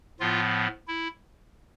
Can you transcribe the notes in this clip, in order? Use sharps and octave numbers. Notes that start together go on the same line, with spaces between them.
A2 F3 B3 F4
E4